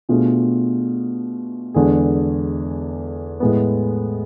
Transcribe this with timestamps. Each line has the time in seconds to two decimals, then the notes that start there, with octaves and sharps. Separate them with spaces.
0.09 B2 A3 D4 F4 G#4
1.74 E2 D3 G#3 D4 G#4
3.40 A2 G#3 B3